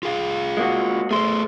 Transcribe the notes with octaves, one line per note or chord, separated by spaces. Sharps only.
F4 G#4 F5
G#3 A#3 F#4
A3 G#4 A4 C5 C6